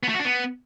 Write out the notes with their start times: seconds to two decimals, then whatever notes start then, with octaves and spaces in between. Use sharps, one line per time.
0.03 B3
0.09 A3
0.14 F#4
0.19 D4
0.25 B3